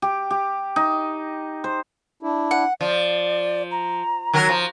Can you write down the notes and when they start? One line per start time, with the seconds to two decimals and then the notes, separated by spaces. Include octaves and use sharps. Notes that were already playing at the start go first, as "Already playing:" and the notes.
0.02 G4
0.31 G4
0.76 D#4
1.64 C5
2.23 D4 E4
2.51 F#5
2.81 F3 D5
3.71 A#5
4.33 D#3 F#3 A#4
4.49 F3